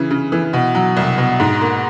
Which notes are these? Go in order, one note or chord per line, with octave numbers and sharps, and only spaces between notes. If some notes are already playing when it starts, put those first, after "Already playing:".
Already playing: C#3 E3
C#3
E3
B2
F#3
C2
B2
G#2
A#3